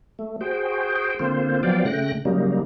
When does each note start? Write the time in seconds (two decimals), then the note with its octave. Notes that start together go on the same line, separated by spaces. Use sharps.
0.19 A3
0.41 F#4 G#4 C5 G5
1.19 D3 A#3 C4 F4 C5
1.63 F3 F#3 B3 D5 F5 G5
1.85 C#3 A3 G5 F#6 A#6
2.25 C#3 F#3 G3 A#3 D#4